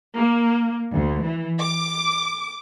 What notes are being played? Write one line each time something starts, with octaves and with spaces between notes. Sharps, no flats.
A#3
D2
E3
D6